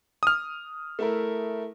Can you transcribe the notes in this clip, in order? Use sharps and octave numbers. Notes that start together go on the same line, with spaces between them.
D#6 F6
A3 E4 A#4